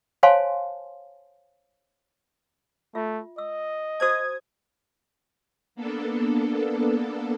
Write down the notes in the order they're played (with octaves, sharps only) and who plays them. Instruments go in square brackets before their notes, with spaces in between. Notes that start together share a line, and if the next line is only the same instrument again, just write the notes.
[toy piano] C5 C#5 F5 G#5 A5 C6
[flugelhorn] A3 [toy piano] F4 E5
[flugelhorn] D#5 [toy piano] E6
[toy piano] F#4 C5 A5 [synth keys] D#6 G#6
[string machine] A#3 B3 D4 A4